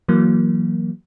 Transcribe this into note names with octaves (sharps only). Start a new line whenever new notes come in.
E3 F#3 A#3